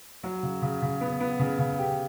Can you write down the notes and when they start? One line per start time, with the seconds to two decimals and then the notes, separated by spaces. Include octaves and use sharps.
0.23 F#3
0.43 C#3
0.62 C#3
0.82 C#3
1.01 B3
1.20 B3
1.39 C#3
1.59 C#3
1.78 G4